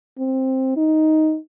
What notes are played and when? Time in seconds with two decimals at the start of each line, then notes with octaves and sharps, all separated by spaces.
0.19 C4
0.77 D#4